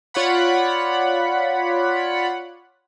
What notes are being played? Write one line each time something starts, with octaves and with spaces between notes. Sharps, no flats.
F4 C#5 D5 F#5 B5